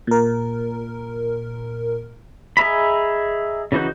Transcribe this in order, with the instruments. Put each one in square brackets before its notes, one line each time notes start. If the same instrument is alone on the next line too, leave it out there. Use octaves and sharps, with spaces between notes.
[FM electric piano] A#2 A#4
[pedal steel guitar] G#4 D#5 E5 A#5 B5
C#3 E3 D#4 F#4 G6